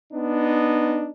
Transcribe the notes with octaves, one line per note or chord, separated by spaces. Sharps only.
B3 D4 D#4